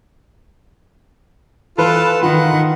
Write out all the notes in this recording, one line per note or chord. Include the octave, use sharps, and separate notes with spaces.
E3 F4 A4 B4
D#3 D#4 F4 F#5